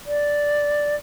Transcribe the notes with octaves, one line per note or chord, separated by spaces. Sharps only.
D5